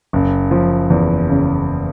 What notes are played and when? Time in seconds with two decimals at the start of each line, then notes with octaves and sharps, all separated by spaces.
0.13 F#1
0.51 F3
0.90 E2
1.29 C#3